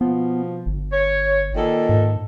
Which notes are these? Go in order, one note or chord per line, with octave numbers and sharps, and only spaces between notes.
B2 F3 B3
G1
C#5
A#2 D#3 A4
G#2